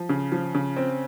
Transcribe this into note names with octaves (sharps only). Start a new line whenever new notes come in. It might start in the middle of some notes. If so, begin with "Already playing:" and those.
Already playing: F3
C#3
F3
C#3
C4